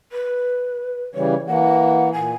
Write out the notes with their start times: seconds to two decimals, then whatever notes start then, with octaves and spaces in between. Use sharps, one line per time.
0.12 B4
1.15 C#3 E3 G3 C#5
1.47 E3 A#3 F#5
2.13 A#2 G#5